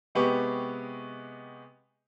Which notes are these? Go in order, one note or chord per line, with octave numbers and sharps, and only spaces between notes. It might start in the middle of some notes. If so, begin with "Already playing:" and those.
C3 G#3 B3 G4 B4 C#6